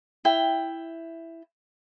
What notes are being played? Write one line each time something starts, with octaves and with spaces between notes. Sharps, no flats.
E4 G5